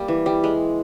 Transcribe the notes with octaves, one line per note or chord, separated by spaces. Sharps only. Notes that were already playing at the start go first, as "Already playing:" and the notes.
Already playing: G3 A#3
E3
G3
G#3